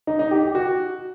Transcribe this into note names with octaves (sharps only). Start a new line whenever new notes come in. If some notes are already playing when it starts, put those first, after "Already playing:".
D#4
D#4
G4
G4
F#4